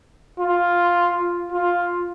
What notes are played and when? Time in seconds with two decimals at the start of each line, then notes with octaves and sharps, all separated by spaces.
0.40 F4
1.52 F4